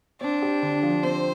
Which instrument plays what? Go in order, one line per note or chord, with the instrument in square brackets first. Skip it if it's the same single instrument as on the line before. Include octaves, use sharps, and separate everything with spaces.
[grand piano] C4 [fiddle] D4
[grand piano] G4
D3
F3
[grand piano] C4 [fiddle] C5